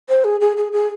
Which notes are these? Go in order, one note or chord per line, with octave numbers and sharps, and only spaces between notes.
C5
G#4
G#4
G#4
G#4